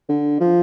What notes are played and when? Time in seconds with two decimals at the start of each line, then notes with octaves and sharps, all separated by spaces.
0.09 D3
0.40 F3